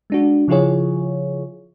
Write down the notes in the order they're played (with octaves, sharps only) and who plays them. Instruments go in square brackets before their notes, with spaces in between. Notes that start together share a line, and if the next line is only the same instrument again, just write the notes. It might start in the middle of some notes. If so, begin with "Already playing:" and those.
[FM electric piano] G#3 D4 F#4
C#3 F3 E4 F4 G#4 C#5